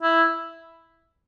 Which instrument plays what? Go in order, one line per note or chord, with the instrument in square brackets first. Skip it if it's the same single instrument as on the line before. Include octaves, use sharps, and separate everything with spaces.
[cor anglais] E4